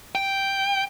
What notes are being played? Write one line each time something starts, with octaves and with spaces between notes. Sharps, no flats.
G5